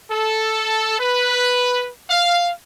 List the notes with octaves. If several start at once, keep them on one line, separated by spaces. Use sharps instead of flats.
A4
B4
F5